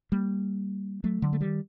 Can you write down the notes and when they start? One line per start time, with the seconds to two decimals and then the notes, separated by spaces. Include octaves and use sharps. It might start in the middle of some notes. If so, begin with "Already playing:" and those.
0.12 G3 A#3
1.04 F#3 A3
1.22 D3 F#3
1.33 A3
1.41 D#3 G3